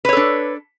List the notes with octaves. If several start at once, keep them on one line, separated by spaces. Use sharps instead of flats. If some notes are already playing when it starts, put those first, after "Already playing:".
D4 A4 B4 C#5